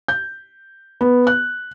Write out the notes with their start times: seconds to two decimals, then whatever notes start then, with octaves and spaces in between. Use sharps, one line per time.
0.08 G6
1.01 B3
1.27 F#6